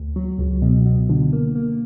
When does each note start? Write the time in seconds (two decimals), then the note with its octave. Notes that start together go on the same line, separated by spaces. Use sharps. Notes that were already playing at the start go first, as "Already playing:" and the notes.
Already playing: D2
0.16 F#3
0.39 C#2
0.62 B2
0.86 B2
1.10 D3
1.33 A#3
1.56 A#3